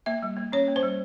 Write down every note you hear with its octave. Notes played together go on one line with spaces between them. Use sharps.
A#3 E5
G3
A#3
C#4 C#5
A#3
C5
G3